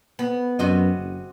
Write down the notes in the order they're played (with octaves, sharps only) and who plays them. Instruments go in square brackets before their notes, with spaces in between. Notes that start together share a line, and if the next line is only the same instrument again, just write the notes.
[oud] B3
[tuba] F#2 [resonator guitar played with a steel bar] C3 F#4 D#5
[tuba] F#1